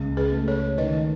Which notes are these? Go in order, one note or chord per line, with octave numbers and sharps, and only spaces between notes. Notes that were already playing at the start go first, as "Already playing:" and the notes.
Already playing: C#2
G#4 B4
A3
A4 C#5
D#3 B4 D#5